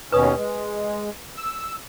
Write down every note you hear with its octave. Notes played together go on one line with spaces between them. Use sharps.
D#2 B2 C#4 B4 D#6
G#3
E6